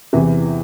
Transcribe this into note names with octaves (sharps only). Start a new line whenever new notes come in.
E2 C3 E3